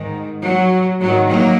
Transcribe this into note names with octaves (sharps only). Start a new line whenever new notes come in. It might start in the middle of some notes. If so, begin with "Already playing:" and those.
Already playing: G#2 D#3
F#3
G#2 D#3 F#3
F#3 A#3